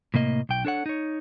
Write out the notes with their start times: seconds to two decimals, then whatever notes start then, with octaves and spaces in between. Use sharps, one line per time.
0.14 A2 C3 A#3 D#5
0.49 B1 G5
0.65 D4 A4 C#5 F#5
0.86 D#4 C#5